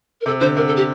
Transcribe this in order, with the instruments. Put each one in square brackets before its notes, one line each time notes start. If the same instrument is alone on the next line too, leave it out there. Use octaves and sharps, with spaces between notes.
[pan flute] A#4
[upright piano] C3 [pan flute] A4
[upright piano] D3 [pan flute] C5
[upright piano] C3 [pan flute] A#4
[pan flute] A4
G4